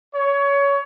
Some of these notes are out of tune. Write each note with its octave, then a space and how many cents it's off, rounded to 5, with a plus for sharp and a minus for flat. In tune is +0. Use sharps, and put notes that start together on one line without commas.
C#5 +20